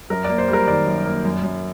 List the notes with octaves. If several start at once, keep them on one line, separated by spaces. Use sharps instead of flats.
F#2 A#4
A#3 D5
C5
G3
A#4
D#3 D5
F#2
A#3
F#2
F#2